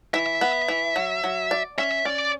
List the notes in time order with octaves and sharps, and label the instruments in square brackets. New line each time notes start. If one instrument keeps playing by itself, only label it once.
[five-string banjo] E3 [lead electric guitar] E5
[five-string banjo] B3
E3
F#3
F#3
D5
[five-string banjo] C#4 [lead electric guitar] E5
[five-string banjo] C#4 [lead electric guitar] D5